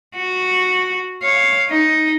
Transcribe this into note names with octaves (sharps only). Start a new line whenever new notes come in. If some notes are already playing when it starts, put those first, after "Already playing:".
F#4
C#5 F5
D#4